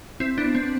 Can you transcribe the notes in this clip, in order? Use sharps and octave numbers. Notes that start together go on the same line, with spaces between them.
C4 E4
B3 D4
C4